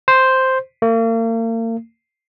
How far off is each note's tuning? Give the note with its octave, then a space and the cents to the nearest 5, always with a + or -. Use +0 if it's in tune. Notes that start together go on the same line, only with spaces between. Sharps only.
C5 +0
A#3 -40